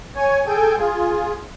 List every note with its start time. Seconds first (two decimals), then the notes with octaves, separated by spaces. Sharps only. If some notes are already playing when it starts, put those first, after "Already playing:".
0.16 C#5 G#5
0.46 G#4 A4 G5 G#5
0.78 F4 G#4